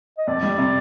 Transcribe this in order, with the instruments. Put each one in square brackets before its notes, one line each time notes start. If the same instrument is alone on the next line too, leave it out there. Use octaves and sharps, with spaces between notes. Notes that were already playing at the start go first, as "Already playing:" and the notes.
[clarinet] D#5
[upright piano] F2 [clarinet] D5
[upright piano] G3
C3